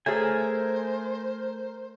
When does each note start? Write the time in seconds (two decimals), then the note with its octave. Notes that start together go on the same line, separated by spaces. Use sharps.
0.06 A3 G#4 A#4 C5 C#5 G#5